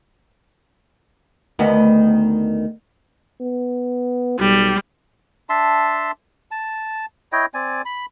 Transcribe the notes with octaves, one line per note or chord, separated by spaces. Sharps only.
D2 D#3 B3
B3
B1 G3
D4 E5 A5 C6
A5
E4 C#5 D#5 G5
C4 D5 G#5
B5